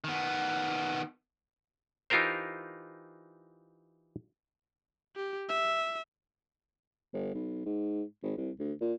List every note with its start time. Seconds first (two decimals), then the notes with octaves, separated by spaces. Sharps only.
0.04 D#3 B3
2.10 E3 D#4 F4 G4 A#4 C5
5.16 G4
5.49 E5
7.13 G1
7.34 B1
7.66 G#2
8.23 G#1
8.37 C2
8.59 D2
8.81 A#2